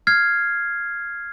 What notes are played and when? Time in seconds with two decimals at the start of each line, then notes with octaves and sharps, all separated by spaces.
0.07 F6 G#6 C7